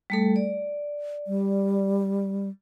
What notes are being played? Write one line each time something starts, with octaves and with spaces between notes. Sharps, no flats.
G3 A3 A4
D5
G3